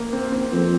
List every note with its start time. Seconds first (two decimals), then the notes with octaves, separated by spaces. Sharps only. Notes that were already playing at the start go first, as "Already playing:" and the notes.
Already playing: A#3
0.13 C4
0.32 C4
0.52 F2 C4